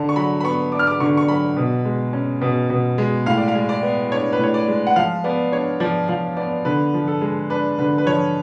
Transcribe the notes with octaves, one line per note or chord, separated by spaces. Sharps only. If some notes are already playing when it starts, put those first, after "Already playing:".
Already playing: D3 A5
C#6
F#3 B5
B5
B3 C#6
D4 D6
F6
D6
D3 C#6
C#6
F#3 B5
B2
G#3
C#4
B2
B2
G#3
A2 F5
D5
F5
G#3
D5
B3
D4 C#5
B4
A2 C#5
D5
G#3
F#5
F3 F5
B3 D5
D4 C#5
F3 D5
F3 F5
B3 D5
D3 B4
F3
A4
G#3
D4 B4
D3 B4
B4
F3 C#5